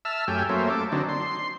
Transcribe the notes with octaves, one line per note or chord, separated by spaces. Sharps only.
E5 A5 E6 F6
F#2 A3 G4 G5 G#5
F#3 A3 A#3 C#4 C5 E5
A4 D6
D3 F#3 C4 D4 D#4
C6